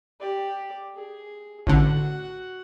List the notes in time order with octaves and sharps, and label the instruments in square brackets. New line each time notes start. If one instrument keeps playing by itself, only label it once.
[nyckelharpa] G4 D5
G#4
[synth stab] A1 D3 [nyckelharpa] F#4 F#5